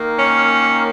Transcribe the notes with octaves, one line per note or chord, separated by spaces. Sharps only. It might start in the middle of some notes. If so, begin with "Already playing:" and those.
Already playing: D#3 A#3
C#4